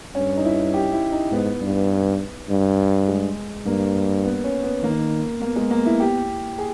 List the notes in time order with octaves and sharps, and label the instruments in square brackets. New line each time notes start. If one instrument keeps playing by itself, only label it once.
[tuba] G2 [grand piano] C#4
[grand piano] D#4
E4
G4
E4
D#4
[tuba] G#2 [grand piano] B3
[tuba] G2
G2
[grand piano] G#3
[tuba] G2 [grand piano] A#3
[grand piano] B3
C#4
B3
[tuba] D#3 [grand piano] A#3
[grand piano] A#3 [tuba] B3
[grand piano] G#3
A#3
E4
G4
G#4